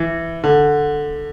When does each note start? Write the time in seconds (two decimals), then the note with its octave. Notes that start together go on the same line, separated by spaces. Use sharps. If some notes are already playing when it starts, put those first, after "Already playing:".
Already playing: E3
0.44 D3